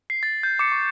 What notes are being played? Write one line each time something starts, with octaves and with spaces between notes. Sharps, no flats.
C7
A6
G6
D6 C#7
C#6